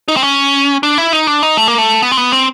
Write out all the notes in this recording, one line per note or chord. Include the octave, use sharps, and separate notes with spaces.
D#4
C4
C#4
D4
E4
D#4
D4
D#4
A3
A#3
A3
B3
C4
B3
C4